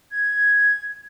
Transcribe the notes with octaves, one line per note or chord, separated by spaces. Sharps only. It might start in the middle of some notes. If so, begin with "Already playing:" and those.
G#6